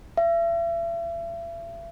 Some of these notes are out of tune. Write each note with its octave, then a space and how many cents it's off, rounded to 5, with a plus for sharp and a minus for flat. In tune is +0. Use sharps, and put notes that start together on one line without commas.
E5 +40